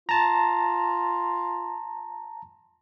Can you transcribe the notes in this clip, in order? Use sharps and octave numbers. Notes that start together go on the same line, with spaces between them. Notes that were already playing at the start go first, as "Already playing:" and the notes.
F4 A5 A#5